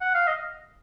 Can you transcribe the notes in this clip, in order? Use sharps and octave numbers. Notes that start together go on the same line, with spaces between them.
F#5
F5
D#5